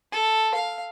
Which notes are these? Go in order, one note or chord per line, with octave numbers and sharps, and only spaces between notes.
A4
F5